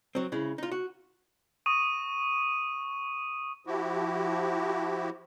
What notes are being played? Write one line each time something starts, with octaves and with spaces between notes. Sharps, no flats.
F#3 C4
C#3 G#3 E4
D#4 F4
F#4
C#6 D#6 D#7
F3 E4 F#4 G4